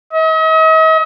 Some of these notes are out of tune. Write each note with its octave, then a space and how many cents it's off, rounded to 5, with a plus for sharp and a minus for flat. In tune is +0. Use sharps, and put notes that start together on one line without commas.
D#5 +45